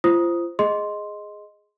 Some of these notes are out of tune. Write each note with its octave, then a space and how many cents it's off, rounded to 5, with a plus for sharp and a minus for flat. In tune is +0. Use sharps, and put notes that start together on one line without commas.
F4 -35 C5 +0 D#6 +0
G#4 +0 D#5 +0 C6 +0